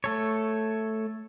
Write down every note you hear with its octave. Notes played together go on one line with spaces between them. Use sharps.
A3 A4 C#5